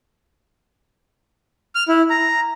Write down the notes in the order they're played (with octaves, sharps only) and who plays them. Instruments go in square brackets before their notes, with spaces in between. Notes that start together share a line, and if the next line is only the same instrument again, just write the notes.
[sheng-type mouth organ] F6
E4
A#5